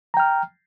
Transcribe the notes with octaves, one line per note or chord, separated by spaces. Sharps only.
G5 A#5 F6